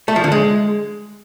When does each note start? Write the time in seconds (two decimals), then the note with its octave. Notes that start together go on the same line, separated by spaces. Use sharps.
0.08 A3
0.16 F3
0.24 D3
0.32 G#3